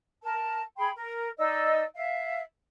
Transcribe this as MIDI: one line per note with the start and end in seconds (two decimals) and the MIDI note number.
0.23 0.61 70
0.23 0.61 81
0.77 0.89 68
0.77 0.89 79
0.77 0.89 83
0.77 0.89 84
0.95 1.29 70
1.38 1.83 63
1.38 1.83 74
1.38 1.83 75
1.38 1.83 88
1.95 2.40 76
1.95 2.40 77